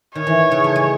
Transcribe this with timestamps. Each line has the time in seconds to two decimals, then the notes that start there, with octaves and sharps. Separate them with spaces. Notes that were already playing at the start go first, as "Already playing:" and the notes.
0.15 D#3 C#5
0.27 E3
0.52 C#3
0.64 A3
0.76 G#3